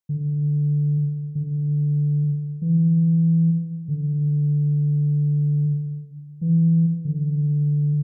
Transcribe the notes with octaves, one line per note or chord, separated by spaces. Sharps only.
D3
D3
E3
D3
E3
D3